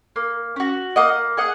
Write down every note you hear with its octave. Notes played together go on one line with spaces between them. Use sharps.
A#3
C#4 F#4
A#3 D#5 F#5
G#4 D#5 F#5